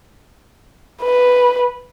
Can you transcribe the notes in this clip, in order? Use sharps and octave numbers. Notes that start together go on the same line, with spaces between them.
B4